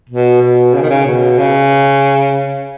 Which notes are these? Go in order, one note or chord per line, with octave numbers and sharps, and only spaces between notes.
B2
B2
C#3
D#3
C#3
B2
C#3